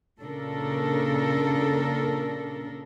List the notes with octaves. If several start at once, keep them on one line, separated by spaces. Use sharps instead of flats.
A#2 C#3 D4 A4 A#4